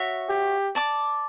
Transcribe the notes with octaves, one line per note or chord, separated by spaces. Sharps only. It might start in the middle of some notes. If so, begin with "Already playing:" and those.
Already playing: F#4 C#5 E5
G4
D5 A5 D6